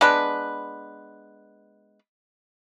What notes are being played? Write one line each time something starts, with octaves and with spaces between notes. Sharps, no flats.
G#3 B3 D4 B4